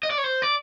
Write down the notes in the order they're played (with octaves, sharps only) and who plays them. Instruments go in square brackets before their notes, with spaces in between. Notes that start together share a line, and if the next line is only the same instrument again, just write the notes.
[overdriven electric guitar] D#5
D5
C#5
C5
D5